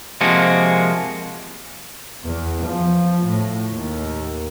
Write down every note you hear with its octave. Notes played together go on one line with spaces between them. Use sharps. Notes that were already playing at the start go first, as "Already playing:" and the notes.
C3 F3 G#3 A#3 F#4
E2
F3
A2
D#2